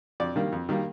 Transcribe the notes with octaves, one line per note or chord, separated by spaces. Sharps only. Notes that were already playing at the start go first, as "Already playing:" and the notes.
F2 D5
D#3 G3 A#3
F2
D#3 G3 A#3